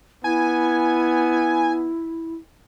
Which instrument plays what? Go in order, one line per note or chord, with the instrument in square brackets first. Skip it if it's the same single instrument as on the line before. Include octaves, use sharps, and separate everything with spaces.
[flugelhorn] B3 [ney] E4 [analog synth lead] G#5